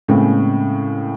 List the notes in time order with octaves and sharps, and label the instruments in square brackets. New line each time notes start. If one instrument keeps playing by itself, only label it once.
[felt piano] A2 C#3 G#3 A#3 C4